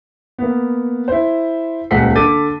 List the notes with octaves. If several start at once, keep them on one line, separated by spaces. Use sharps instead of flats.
A#3 B3
E4 C5
D#1 C#2 F3 F#5 B6 C7
D3 A4 D6 A6 D#7